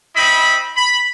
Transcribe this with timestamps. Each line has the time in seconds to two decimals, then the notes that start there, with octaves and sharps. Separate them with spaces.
0.16 C4 E4 D#5 B5
0.76 B5